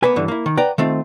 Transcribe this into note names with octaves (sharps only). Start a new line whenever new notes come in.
A#3 B3 B4 G#5
G2 D3 E3
A#3 E4
D#3
B4 D5 F#5 G5 A#5
D#3 A3 C4 F4